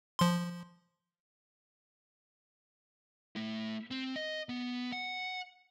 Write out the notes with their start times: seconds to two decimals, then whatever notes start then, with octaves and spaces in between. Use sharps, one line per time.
0.19 F3 C6
3.36 A3 E4
3.91 C4
4.16 D#5
4.49 B3
4.92 F#5